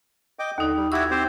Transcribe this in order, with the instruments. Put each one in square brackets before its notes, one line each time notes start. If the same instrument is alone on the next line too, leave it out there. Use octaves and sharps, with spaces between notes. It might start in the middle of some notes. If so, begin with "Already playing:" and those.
[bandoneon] D#5 G5 D6
[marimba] D#2 D#4 [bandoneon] D3
[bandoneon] G3
[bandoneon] E4 F#4 G4 [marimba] E6 G#6
[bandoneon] C4 G4 C5